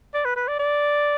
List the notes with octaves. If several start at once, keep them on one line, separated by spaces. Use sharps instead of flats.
D5
B4
B4
D5
D5